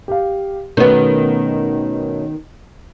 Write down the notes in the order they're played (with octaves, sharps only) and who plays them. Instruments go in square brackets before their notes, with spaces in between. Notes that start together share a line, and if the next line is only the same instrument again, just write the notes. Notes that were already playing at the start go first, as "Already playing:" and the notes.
[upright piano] G4 F5
[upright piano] B2 A3 C#4 [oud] D#3 B3